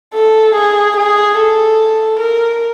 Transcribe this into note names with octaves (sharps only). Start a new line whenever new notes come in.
A4
G#4
G#4
A4
A#4